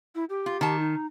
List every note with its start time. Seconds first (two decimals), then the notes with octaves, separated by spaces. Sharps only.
0.15 E4
0.29 G4
0.46 F4
0.61 D#3 A5
0.79 D#4